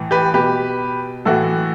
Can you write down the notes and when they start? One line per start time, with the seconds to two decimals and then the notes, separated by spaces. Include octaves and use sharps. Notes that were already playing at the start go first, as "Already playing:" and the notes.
Already playing: A2 E3
0.11 G4 B4
0.34 B2 G4 B4
1.25 A2 E3 F#4 A4